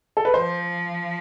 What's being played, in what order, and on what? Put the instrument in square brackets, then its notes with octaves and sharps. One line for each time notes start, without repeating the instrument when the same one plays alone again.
[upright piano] A4
B4
[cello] F3 [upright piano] C5